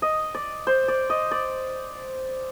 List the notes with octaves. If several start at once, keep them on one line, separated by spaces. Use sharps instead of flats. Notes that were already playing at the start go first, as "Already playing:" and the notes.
D#5
D5
C5
D5
D#5
D5